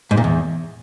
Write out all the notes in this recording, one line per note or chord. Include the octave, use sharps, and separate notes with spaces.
G#2
A#2
E2